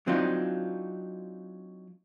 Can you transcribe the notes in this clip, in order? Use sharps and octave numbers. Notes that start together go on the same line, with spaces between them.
F#3 C4 D4 D#4 F4